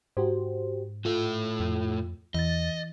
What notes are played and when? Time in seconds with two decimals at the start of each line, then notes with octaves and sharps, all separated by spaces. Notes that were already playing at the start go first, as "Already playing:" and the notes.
0.17 G#2 F#4 G4 C5
1.05 A2 F4 A4
1.60 F2
2.34 E2 E3 D#5 A6